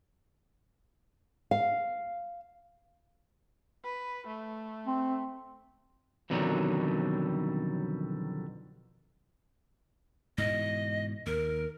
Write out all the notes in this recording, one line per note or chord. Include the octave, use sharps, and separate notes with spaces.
F5
B4
A3
C4
F2 B2 D3 D#3 F#3 G3
G#2 B2 E3 D#5
D#2 A#4